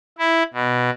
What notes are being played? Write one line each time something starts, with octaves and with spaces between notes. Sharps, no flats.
E4
B2